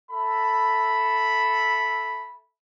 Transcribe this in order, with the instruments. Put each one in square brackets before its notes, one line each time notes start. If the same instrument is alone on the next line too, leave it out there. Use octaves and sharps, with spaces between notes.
[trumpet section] A4 E5 B5